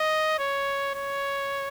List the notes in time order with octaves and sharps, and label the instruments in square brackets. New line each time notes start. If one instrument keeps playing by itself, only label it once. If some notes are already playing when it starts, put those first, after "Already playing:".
Already playing: [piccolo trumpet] D#5
C#5
C#5